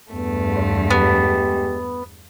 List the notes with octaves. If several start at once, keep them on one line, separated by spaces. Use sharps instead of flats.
E2 G2 A3 B3
G#3 B3 G4